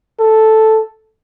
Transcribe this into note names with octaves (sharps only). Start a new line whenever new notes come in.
A4